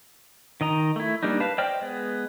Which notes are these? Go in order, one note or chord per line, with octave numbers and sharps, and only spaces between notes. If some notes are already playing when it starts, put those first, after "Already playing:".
D#3 D#5 A#5
A3 E4
G3 A#3 D4 D#4
B4 F5 A5
C5 D5 D#5 G5 F6
G#3 B3